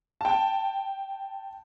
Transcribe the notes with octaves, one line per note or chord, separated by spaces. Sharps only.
G5 A5